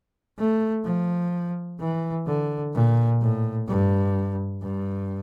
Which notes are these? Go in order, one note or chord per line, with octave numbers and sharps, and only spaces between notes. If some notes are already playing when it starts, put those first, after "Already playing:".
A3
F3
E3
D3
A#2
A2
G2
G2